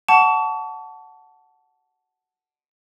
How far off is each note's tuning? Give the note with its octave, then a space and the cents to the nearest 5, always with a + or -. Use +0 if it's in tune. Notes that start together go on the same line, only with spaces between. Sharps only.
F#5 +0 A5 +0 C#6 +40